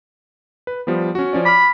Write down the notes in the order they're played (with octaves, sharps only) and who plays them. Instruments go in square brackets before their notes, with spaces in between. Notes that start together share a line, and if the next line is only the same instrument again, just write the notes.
[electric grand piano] B4
F3 G3 B3
C#4 F#4
F3 C#4 D5
[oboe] B5 [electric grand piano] D6 F6